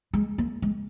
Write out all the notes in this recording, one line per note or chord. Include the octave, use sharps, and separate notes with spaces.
G#3
A#3
G#3